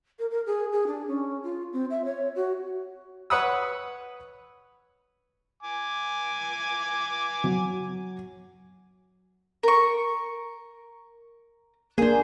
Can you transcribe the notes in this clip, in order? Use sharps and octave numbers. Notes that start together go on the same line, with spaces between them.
A#4
A#4
G#4
G#4
D4
C#4
F4
C4
E5
C#5
F#4
B4 C#5 F#5 B5 D#6 E6
G#5 D6
F#3
A#4 C#6
A#3 D4 G#4 C5